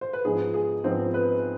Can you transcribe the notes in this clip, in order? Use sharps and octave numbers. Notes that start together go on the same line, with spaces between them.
C5
B4
G#2 F3 B3 F4 G#4
G#4
G#2 F3 B3 C4 F4 C5
B4